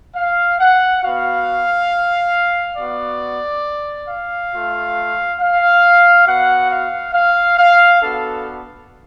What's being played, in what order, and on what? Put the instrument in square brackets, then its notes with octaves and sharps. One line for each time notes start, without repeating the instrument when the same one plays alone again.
[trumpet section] F5
F#5
B3 F#4 F5
B3 F#4 D5
F5
A3 F4
F5
B3 F#4 F#5
F5
F5
F5
B3 D4 F#4 A4